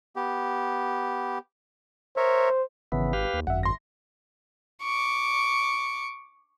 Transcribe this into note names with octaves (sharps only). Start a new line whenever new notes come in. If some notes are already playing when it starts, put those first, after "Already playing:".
B3 G4
A#4 C5 C#5 E5
G#1 C#3 E3 B3
G4 B4 F5
D#2
G#1 F#2 E5 F#5
C6 A#6
C#6 D6